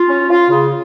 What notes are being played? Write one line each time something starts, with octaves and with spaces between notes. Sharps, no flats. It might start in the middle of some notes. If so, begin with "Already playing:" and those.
Already playing: F4
C#4
F4
C#3